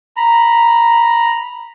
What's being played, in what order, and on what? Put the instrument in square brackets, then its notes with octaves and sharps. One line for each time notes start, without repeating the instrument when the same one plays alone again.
[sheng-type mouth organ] A#5 B5